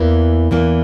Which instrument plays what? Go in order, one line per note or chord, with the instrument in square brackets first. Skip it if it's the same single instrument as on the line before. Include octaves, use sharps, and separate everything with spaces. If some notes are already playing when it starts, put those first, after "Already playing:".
Already playing: [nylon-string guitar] E2 E3 A#3
E2 E3 A#3